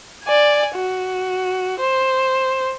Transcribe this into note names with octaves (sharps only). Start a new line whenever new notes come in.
D5 G#5
F#4
C5